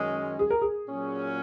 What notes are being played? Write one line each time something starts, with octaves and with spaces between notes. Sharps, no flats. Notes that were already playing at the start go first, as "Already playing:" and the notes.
Already playing: F#2 D#3 G#3 C#4
G#4
A#4
G#4
A#2 F#3 C#4